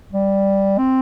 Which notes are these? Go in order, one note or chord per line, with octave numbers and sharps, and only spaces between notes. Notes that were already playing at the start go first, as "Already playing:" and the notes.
G3
C4